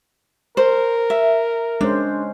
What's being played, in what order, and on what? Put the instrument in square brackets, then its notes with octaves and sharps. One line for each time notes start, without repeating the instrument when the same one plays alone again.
[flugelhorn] A#4 [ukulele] C5
[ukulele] E5
[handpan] G#3 C#4 C5 [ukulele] D4